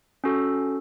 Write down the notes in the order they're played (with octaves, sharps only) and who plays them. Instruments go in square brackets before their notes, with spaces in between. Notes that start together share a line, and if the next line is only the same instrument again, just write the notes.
[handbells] C#4 F#4 A4